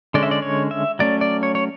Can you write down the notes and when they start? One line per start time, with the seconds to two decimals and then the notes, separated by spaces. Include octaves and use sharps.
0.14 D3 G#3 C#4 D5
0.23 E5
0.31 D5
0.42 C#5
0.71 E5
0.99 F#3 A3 C#4 D5
1.21 D5
1.43 C#5
1.55 C#5